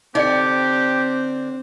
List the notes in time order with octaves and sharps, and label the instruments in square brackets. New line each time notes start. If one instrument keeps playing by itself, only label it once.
[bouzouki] D3 D4 [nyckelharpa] C4 [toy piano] D#4 D5 G5 [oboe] G4